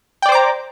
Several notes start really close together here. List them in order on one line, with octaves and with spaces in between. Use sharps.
G5 D5 C5 D6 A#5